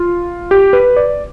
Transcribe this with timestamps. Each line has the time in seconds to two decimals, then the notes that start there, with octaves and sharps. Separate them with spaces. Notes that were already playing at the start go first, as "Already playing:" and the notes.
Already playing: F4
0.51 G4
0.73 B4
0.97 D5